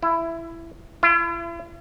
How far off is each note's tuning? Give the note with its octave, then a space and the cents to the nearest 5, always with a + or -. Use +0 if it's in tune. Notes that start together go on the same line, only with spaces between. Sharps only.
E4 +15
E4 +45